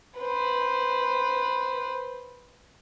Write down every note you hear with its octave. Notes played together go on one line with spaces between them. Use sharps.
B4 C5